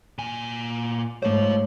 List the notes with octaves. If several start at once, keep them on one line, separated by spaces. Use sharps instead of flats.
A#2 G#5
G#2 A3 C5 C#5 F5